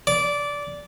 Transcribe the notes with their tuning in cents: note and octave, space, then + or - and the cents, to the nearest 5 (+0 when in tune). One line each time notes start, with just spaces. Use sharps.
D5 -15